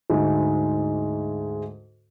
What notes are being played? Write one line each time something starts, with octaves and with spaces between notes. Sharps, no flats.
D2 G#2 G#3 D#4